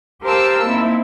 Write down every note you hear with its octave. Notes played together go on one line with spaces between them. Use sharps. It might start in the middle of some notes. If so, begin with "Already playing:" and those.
G4 A#4 C5 F5 A5 E6
A#3 C4 D#4 E4